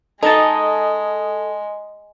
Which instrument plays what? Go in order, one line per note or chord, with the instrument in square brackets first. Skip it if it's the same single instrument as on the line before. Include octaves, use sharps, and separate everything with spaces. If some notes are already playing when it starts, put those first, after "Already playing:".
[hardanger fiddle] G#3 [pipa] D#4 [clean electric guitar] G#4 D#5 A5 [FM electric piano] A4